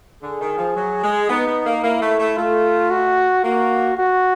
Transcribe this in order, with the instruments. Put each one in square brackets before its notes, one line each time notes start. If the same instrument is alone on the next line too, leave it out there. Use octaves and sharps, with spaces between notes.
[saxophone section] D3 [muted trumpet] G#4
[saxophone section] D#3
F3
F#3
G#3
[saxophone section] B3 [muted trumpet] D#4
[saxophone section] B3
A#3
[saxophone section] A#3 [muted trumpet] E4
[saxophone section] A3
A3
[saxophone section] A3 [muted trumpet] F4
[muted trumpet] F#4
[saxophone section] A#3 [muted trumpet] F#4
[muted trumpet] F#4